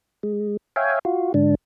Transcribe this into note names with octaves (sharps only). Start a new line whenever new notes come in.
G#3
C#5 E5 F5 G5 G#5
F4 F#4
G#2 D3 D4